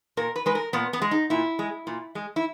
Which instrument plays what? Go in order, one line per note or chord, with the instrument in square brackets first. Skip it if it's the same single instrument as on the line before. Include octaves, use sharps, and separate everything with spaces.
[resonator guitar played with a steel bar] A#2 A#4
B4
G#3 B4
A#4
A#2 B3
B3
G#3
D#4
A#2 E4
G#3
A#2
G#3
E4